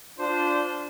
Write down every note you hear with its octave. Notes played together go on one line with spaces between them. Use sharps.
D4 F4 C5